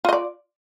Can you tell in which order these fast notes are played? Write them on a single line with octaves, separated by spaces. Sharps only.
F4 D#5 D5